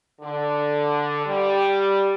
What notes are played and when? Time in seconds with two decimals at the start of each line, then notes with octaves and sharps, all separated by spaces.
0.22 D3
1.26 G3